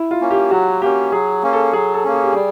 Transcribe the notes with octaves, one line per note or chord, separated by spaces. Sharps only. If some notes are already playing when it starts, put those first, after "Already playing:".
Already playing: E4
F4
A#3 C#4
G4
F#3 F#4
A#3 C#4 G4
F#3 G#4
A#3 C#4
A4
F#3 G#4
A4
A#3 C#4
G#4
G4
G3 G#4